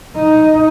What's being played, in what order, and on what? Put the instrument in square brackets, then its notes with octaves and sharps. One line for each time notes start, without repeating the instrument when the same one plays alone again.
[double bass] D#4